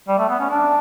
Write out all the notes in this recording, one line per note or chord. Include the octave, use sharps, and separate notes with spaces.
G3
A3
B3
C#4
D4